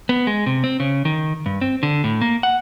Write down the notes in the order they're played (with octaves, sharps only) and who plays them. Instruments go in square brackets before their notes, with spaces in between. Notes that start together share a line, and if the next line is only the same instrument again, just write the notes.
[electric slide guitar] B3
G#3
C3
C4
C#3
D#3
G2
C4
D3
A2
A#3
F#5